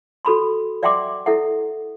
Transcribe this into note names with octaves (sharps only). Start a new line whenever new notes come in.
F#4 A4 B5 C6
D5 E5 F#5 G5 C6 D6
E4 A4 E5 F#5